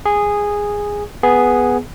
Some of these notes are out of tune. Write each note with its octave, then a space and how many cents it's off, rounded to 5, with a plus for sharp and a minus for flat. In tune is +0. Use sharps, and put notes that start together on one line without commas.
G#4 -10 D#6 +0
B3 +0 G#4 +0